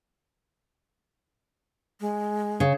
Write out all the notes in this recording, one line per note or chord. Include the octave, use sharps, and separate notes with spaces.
G#3
C#3